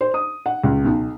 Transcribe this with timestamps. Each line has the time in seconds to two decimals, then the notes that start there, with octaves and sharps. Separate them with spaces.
0.01 C5
0.14 D#6
0.46 F#5
0.64 C#2
0.85 B1